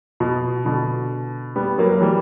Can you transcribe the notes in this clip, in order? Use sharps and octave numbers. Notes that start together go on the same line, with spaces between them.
B2
B2 D3
G3 B3
F#3 A#3
F#3
E3 G3